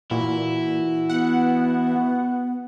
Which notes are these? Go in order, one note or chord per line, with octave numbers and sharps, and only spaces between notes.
A#2 E3 E4 F#4
B3 F#5